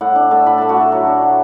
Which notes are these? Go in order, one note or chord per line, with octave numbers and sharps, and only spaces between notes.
A2 F#5
D4
A3 A5
A2 B5
A3 A5
F#4
A3 E4
F#3 F#4
D4
F#3